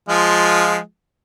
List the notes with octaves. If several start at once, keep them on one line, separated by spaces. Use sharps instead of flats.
F3 G#3 F4